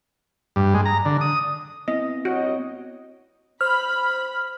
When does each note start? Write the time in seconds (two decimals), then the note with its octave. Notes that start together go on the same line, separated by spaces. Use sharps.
0.56 G2
0.74 G#3
0.85 A#5
1.05 D3
1.21 D#6
1.88 B3 C4 E4 D#5
2.25 G2 F#4 C#5 D#5
3.61 C5 B5 F6